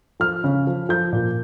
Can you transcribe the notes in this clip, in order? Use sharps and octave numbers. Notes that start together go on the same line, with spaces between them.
F3 F6
C#3
F3
F3 G6
A#2